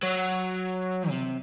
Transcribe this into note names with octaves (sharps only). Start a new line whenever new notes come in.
F#3
C3